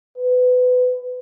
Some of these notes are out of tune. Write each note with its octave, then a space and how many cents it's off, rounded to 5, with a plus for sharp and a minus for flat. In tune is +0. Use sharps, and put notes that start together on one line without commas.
B4 +25